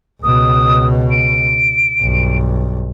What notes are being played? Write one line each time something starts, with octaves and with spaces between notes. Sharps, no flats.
C#2 B2 D#6
D7
B1 G2